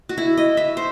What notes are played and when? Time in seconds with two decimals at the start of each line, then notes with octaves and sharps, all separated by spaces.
0.09 F#4
0.18 E4
0.37 D#5
0.57 E5
0.77 C5